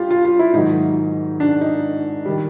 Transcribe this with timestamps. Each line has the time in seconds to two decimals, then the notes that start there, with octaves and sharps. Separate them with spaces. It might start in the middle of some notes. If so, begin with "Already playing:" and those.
Already playing: G2 F4 G4
0.10 F4
0.25 F4
0.39 E4
0.54 G#2 D#3 F#3 D#4
1.40 D4
1.61 D#4
2.25 D#3 G3